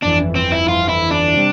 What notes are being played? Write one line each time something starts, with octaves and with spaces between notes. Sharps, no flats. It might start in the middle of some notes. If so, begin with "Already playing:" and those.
G1 F2 E3 D4
C4
E4
G1 F2 E3 F4
E4
D4
C3 G3